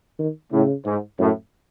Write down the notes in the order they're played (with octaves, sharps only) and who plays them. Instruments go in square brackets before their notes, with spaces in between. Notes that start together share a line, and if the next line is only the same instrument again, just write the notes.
[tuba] D#3
[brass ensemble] A2 [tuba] C#3
[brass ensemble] G#2
[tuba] F#2 [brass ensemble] A2